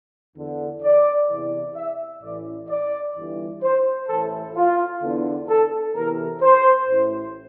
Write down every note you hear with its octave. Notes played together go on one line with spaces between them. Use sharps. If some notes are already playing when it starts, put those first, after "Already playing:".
E2 D3
D5
E2 C3 E3
E5
A1 A2 E3 D5
D5
G1 G2 E3
C5
A1 A2 E3 A4
F4
E2 D3
A4
E2 C3 E3 A#4
C5
A1 A2 E3